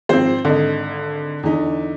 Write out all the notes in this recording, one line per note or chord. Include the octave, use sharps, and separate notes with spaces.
G#1 F3 C4 C5
G#1 D3 D#5
E2 D3 D#4